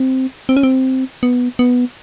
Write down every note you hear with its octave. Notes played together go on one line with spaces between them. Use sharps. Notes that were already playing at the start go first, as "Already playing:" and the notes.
Already playing: C4
C4
C#4
C4
B3
B3